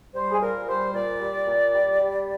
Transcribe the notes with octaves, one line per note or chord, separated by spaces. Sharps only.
G3 C5
G#4
A#2 A#4
G3 C5
A#2 D5
G3
A#2
G3
G3